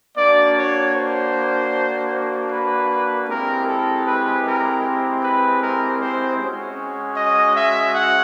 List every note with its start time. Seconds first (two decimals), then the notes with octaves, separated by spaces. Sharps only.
0.17 A#3 D4 F#4 D5
0.57 C#5
0.95 C5
2.51 B4
3.28 G#3 C4 E4 G4 A#4
3.67 A4
4.06 B4
4.45 A#4
5.22 B4
5.61 A#4
6.00 C5
6.38 G#3 C#4 F#4
7.16 D#5
7.56 E5
7.94 F#5